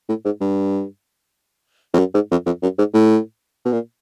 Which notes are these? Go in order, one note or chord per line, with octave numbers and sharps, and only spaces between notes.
A2
G#2
G2
F2
F#2
G#2
F2
F2
F#2
G#2
A2
B2
A#2